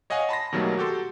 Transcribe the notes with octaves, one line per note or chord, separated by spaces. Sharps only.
C#5 D#5 F5 F#5 G#5
A5 B5 C6 A#6
B2 D#3 F#3 G3 A3 A#3
F#4 G4 A4 C6